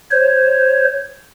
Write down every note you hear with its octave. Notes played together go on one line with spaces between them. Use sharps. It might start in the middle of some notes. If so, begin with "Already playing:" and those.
C5 C#5